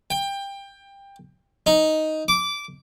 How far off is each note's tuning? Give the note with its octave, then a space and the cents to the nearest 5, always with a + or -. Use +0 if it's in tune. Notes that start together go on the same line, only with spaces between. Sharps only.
G5 +20
D#4 +5
D6 -15